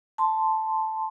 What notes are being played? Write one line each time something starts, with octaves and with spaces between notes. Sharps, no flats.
A5 C6